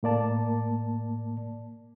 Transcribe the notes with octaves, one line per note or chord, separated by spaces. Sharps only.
A2 A#3 D5 A5